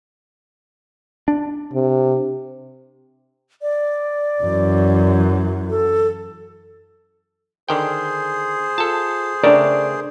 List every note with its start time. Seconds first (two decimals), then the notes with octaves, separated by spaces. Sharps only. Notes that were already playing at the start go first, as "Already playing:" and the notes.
1.28 D4
1.73 C3
3.62 D5
4.42 F#2 E3
5.70 A4
7.69 D3 D#3 G#4 C5 G5
8.78 F4 A4 A5
9.44 C#3 A3 C4 D4 A#4 D5